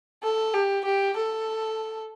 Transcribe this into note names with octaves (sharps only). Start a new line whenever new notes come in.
A4
G4
G4
A4